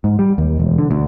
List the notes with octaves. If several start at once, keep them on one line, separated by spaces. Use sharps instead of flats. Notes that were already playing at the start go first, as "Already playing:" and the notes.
G#2
G3
D#2
E1
D3
D2